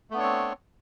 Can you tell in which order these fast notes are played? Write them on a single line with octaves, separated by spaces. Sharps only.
A3 B3 D4 C#5 C4